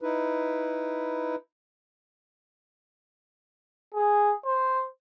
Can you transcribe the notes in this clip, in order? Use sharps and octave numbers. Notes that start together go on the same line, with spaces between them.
D#4 E4 B4
G#4
C5